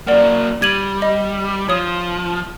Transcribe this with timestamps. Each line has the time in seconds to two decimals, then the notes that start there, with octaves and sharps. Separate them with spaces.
0.07 F#3 A#3 D5 F#5
0.62 G3 G#6 D#7 F#7
1.02 D#5
1.69 F3 C#5 D#6